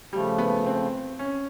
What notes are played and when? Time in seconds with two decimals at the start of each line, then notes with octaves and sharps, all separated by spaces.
0.12 C#3 F3 G3 A3
0.38 B3
0.66 C4
1.19 C#4